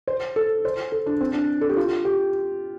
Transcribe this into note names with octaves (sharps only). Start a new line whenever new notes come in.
C5
A4
C5
A4
D4
C4
D4
A4
G4
F4
G4